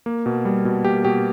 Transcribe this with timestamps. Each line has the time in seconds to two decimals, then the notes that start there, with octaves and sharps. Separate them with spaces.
0.06 A#3
0.26 B2
0.45 G3
0.65 B2
0.85 A#3 G4
1.04 B2 G4